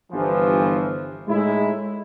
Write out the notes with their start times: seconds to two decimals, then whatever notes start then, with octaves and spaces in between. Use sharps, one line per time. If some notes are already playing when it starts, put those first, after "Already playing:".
0.12 G1 E3 F3
1.28 A2 G#3 D#4 E4